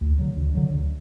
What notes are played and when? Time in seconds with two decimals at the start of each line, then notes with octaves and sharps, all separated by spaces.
0.01 D2
0.19 D3 F#3
0.36 D2
0.55 D3 F#3
0.74 D2